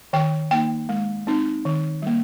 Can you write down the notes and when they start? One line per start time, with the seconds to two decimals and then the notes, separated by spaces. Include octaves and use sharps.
0.13 D#3 G5
0.51 A#3 D#4 G5
0.89 G#3
1.27 C4 D#4
1.65 D#3
2.02 G3 A#3